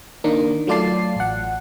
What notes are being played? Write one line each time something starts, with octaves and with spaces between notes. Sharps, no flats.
D#3 A#3 D4 D#4
F#3 A3 F4 D5 A5 C7
A1 F#5